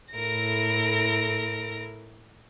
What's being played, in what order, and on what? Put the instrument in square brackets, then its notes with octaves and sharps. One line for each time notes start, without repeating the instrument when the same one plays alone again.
[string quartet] A2 E4 A4 A#4 A#6